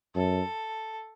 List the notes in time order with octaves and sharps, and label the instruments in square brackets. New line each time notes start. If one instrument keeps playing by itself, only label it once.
[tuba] F#2 [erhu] A4